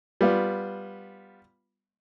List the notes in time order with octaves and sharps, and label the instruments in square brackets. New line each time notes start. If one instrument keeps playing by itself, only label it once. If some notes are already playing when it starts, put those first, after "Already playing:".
[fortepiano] G3 B3 F4